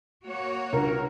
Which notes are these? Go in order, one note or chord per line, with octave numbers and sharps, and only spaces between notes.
A#3 F#4 C#5
C#2 G2 A#4